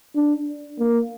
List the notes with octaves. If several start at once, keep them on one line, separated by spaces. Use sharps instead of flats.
D4
A#3